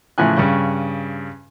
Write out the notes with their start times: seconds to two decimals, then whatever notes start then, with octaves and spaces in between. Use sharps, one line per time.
0.18 A2 C#3 E3 F3 G#5 F#6
0.37 G2 C#3 C#6